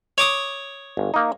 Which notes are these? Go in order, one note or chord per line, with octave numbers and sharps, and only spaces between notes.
C#5 D6 D#6
G1
A#3 D#4